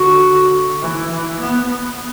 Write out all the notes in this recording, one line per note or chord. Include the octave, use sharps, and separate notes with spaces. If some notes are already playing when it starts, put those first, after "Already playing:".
Already playing: D3 F#4
E3
E3
B3
B3